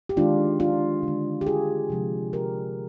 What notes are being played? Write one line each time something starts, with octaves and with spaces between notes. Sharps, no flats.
G4
D#3 G#3 D4 F4
D4 F4
D3 G#3
G4
F4 G#4
C3 F3 G#3
G4 A#4